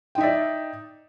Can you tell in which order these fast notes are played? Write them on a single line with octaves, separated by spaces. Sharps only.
G5 D#4 E5 D5